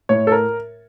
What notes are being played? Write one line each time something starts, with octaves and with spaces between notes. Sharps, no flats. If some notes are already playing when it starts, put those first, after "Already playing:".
A2 C#5
A4
A#4